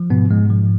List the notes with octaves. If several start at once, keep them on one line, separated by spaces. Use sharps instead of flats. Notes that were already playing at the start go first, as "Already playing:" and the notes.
Already playing: F3
G#2 B2 B3
G#2 G#3
F3